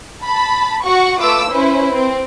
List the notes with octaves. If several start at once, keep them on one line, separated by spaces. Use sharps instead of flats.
A5 B5
F#4 F#5 C#6
A3 F4 B4 D6 E6
C#4 E4 B4 C5
C4